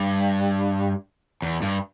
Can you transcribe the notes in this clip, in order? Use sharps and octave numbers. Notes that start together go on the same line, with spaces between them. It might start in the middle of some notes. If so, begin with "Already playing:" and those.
Already playing: G2
E2
G2